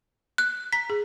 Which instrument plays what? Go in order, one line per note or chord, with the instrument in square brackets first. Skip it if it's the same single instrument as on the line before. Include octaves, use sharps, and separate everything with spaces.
[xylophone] F#6
[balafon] A#5 [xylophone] B6
[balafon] G#4